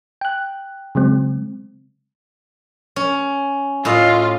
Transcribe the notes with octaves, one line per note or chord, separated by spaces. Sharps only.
G5 F#6
C#3 F#3 G#3 C4
C#4
A2 F4 D#5